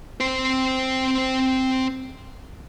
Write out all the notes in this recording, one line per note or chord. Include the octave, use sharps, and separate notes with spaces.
C4 C5